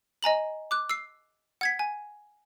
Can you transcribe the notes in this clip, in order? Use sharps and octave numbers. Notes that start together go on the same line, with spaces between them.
D#5 G#5 A#5 F#7
D6 F#6
E6 C7
F#5 G#6 B6
G#5